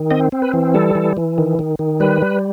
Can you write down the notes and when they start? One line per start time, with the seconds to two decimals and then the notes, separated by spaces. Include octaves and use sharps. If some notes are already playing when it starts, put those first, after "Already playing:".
Already playing: D#3
0.11 C4 D#5
0.32 C4
0.42 B4
0.53 E3
0.74 G3 A4
0.95 E3
1.17 E3
1.38 D#3
1.59 D#3
1.79 D#3
2.00 G3 B4
2.22 G3